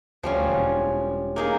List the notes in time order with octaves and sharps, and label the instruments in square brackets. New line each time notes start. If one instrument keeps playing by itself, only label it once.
[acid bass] D2 [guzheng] F3 G3 C#4
[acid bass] E1
[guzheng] A#3 D#4 G#4